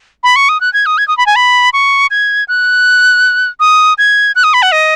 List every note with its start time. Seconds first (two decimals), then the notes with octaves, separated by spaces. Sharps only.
0.24 B5
0.36 C#6
0.49 D#6
0.61 F#6
0.73 G#6
0.86 D#6
0.98 G#6
1.08 D#6
1.18 B5
1.26 G#5
1.36 B5
1.73 C#6
2.11 G#6
2.48 F#6
3.60 D#6
3.98 G#6
4.36 F#6
4.44 D#6
4.54 B5
4.62 F#5
4.72 D#5